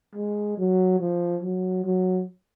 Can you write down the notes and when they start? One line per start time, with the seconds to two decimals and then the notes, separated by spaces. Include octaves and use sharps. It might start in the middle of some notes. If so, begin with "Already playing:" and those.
0.15 G#3
0.58 F#3
1.00 F3
1.43 F#3
1.84 F#3